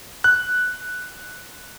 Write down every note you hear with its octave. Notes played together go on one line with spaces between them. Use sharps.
F#6